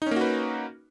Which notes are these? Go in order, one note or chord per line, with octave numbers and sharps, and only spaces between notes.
A#3 C#4 D#4 F#4 B4